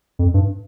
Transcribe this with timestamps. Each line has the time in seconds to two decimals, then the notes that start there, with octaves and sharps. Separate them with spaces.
0.19 F2
0.34 G2